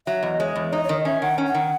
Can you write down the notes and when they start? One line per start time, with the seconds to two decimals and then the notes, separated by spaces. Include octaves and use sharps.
0.07 F#3 E5
0.23 E2 D#5
0.40 G#3 C#5
0.56 E2
0.72 D#4 D#5
0.84 C#5
0.89 D#3 D#5
1.05 C#4 E5
1.22 D#3 F#5
1.38 C#4
1.47 F#5
1.54 D#3